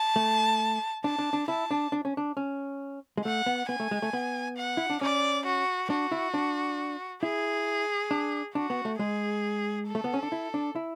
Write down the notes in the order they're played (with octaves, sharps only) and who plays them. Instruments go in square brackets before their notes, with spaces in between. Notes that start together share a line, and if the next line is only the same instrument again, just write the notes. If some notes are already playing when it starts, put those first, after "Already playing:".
Already playing: [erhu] A5
[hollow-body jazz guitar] A3
[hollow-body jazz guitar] D4 [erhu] A5
[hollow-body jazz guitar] D4
D4
[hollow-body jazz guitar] E4 [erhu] A5
[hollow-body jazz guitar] D4
D4
C#4
D4
C#4
G#3
[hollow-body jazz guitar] A3 [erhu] F#5
[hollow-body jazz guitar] B3
[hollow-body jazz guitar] B3 [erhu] G#5
[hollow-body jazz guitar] A3
G#3
A3
B3
[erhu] F#5
[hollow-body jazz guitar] E4
D4
[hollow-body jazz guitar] C#4 [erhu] D5
[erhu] F#4
[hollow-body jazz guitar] D4 [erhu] F#4
[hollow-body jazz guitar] E4
D4
[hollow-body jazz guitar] E4 [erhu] G#4
[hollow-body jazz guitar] D4
[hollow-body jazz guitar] D4 [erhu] F#4
[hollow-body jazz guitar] B3
A3
[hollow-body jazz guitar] G#3 [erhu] G#4
[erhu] A4
[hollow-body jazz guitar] A3
B3
C#4
D4
E4
D4
E4